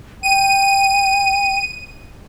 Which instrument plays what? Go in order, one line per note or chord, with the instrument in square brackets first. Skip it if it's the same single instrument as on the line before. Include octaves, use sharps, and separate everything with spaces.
[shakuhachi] G5 [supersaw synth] D#7